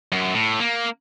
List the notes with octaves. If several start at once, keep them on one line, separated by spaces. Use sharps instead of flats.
F#2
A2
A#3